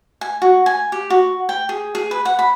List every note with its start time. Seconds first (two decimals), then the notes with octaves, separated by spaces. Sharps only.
0.21 G#5
0.42 F#4
0.66 G#5
0.92 G4
1.10 F#4
1.49 G5
1.69 G#4
1.95 G#4
2.11 B4
2.25 F#5
2.39 B5